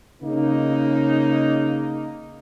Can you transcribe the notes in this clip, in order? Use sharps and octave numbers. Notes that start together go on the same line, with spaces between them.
C#3 A#3 D#4